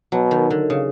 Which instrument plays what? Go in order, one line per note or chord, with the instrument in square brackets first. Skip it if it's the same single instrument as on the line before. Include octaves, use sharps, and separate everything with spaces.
[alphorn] B2 [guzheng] F#3
[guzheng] D#3
D3
C#3